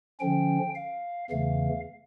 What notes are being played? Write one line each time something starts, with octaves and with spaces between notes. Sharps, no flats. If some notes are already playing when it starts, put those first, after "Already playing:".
D3 F3 C#4 G5
F5
E2 C#3 E3 A3 F5